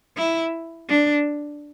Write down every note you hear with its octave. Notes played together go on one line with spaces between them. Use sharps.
E4
D4